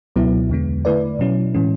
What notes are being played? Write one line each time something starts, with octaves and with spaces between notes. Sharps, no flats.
C#2 B2 F#3 B3 E4
E2 D3 G#3 B3
D3 A3 E4 B4 D5
B2 F#3 C#4 E4
A2 E3 G#3 C#4